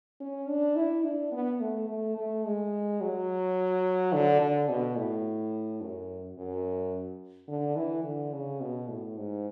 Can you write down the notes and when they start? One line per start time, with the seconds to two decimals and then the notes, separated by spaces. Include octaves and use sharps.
0.20 C#4
0.49 D4
0.76 E4
1.04 D4
1.32 B3
1.61 A3
1.89 A3
2.17 A3
2.45 G#3
3.01 F#3
4.13 D3
4.41 D3
4.69 B2
4.96 A2
5.81 F#2
6.37 F#2
7.48 D3
7.76 E3
8.05 D3
8.33 C#3
8.61 B2
8.89 A2
9.17 G#2